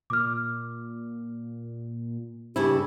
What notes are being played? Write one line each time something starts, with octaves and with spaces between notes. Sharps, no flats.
A#2 D6 F6
G2 C#3 E4 G4